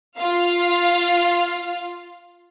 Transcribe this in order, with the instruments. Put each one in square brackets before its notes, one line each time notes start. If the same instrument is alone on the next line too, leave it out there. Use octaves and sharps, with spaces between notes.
[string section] F4 F5